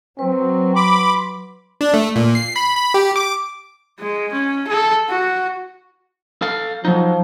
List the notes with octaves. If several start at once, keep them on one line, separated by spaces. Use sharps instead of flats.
F#3 C4 B4
B5 C6 D6
D4
A3
A#2
C7
B5
B5
G4
D6
G#3
C#4
A4
F#4
A4 F5
F3 F#3 D#4